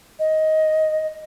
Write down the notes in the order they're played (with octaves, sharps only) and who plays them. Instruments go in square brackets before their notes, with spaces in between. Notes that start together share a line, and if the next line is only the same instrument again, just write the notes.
[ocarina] D#5